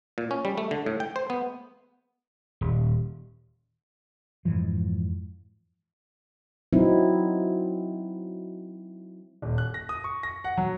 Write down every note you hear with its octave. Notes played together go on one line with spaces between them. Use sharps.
A#2
C#4
G3
A3
D3
A2
G5
C5
B3
D#1
F2 G#2 E3 F3
F#3 C4 D#4 E4
D#1
F#6
A#6
D#6
C#6
A#6
F#5
F#3